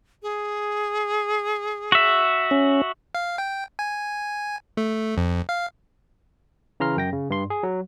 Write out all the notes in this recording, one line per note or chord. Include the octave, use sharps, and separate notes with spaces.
G#4
F#4 E5
C#4
F5
G5
G#5
A3
F2
F5
C#3 E3 A#5 C6 F6
F#2 G5 A#6
C#3
G2 C6
G#4
F#3